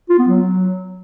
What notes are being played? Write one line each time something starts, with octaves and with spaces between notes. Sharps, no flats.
F4
B3
F#3